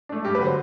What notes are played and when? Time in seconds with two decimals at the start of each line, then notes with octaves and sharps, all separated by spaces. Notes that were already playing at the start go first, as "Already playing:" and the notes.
0.09 A3 D4
0.25 G2 G4
0.35 B4
0.40 D3 F#3 C5